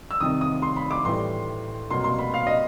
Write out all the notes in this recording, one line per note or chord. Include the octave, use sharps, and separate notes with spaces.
E6
C2 C3 D#3 D#6
D#6
C6
B5
D6
A2 E3 G3 C6
C2 B2 F#3 A#3 C6
C6
B5
F5
D#5